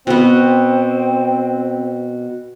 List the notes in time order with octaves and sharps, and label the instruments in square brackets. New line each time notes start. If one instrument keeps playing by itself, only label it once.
[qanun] B2 B3 [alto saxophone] C4